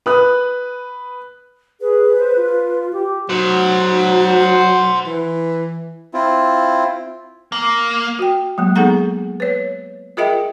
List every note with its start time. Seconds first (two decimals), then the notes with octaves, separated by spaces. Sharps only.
0.06 B4 D#6 F#6
1.81 G#4 B4
2.18 C5
2.36 F4
2.93 G4
3.29 F#3 C5 F#5
5.06 E3
6.14 C4 E4 F4
7.52 A#3
8.19 F#4 G5
8.58 F#3 G#3 A#3
8.76 B3 D#4 G#4 A4 F#5 A#5
9.40 B4 C#5
10.17 F4 G#4 A#4 D#5 E5 G5